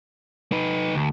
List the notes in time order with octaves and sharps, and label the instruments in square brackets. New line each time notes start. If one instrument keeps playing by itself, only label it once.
[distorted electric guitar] D#4 B4
D2